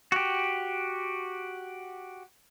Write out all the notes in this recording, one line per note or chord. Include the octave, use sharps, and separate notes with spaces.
F#4 G4